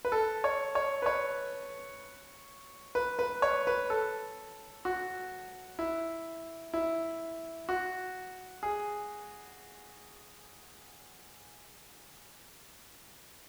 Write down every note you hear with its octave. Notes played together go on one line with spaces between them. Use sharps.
B4
A4
C#5
C#5
B4
C#5
B4
B4
C#5
B4
A4
F#4
E4
E4
F#4
G#4